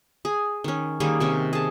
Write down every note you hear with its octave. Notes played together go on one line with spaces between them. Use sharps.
G#4
D#3 C#4
D#3 G3 A#3 G#4
C3 D#3 C#4
G#4 A5